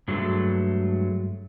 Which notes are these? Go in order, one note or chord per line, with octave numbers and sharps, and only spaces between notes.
G2 F#3 G#3 A3